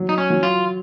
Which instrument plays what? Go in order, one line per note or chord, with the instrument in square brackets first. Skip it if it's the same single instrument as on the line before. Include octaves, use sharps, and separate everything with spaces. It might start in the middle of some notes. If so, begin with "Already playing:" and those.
Already playing: [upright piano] F#3
[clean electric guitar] D#4
C#4
[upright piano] F#3
[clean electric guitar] F4